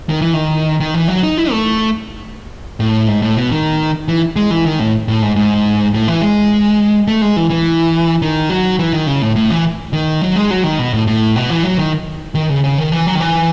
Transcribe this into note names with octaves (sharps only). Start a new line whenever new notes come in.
D#3
E3
D#3
D#3
E3
F#3
D#4
E4
A3
A2
G#2
A2
B2
D#3
E3
G#3
E3
D#3
A2
A2
G#2
G#2
A2
E3
G#3
A3
G#3
E3
E3
D#3
F#3
E3
D#3
C#3
A2
A2
E3
D#3
F#3
G#3
F#3
D#3
B2
A2
A2
B2
E3
F#3
D#3
D#3
C#3
C#3
D#3
E3
F#3
D#3
E3